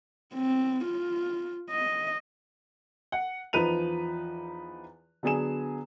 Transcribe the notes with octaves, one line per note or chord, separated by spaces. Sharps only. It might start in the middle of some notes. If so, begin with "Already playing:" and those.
C4
F4
D#5
F#5
E2 F3 D#4 B4 D#7 F7
D3 F#3 B3 G#4 G#5 E7